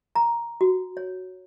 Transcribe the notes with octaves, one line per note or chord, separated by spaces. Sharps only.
A#5
F#4
C#5